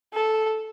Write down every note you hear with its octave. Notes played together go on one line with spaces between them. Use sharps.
A4